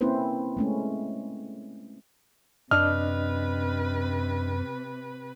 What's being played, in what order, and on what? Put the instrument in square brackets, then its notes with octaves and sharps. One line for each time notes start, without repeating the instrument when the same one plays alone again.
[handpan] A#3 C4 C#4 E4 B4 C5
G#3 A3 C#4
[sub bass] F#2 [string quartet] C3 B4 [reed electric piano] D4 D#5 [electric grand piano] F6